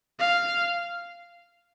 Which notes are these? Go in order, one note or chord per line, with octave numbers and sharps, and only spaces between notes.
F5